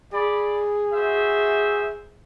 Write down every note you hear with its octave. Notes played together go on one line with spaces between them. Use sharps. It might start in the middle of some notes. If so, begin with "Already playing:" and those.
G#4 D5 B5
F#4 C5 E5